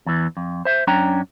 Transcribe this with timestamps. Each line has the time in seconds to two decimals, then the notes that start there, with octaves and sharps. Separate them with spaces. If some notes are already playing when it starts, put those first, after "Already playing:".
0.06 E2 E3
0.37 F2
0.65 C5 E5
0.87 F#2 C#4 D4 G5 A#5